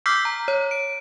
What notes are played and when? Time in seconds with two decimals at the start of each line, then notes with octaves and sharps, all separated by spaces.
0.06 D6 E6 F6 G6 B6 C7
0.25 A#5
0.48 C#5
0.71 D7